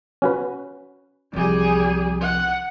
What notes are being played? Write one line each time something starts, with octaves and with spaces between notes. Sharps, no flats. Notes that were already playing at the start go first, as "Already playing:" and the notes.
C#4 F#4 B4
C2 F3 G3 G#4
F#5